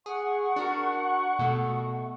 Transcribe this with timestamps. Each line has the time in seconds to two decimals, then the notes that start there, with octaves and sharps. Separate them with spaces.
0.06 G#4 F#5 C#6
0.56 D4 F#4 A#4
1.39 B2 A3